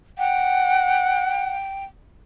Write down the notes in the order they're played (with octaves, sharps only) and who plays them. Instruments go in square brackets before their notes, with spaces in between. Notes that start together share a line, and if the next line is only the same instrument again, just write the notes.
[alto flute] F#5 [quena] G5